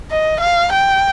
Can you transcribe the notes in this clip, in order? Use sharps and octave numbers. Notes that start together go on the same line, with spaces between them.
D#5
F5
G5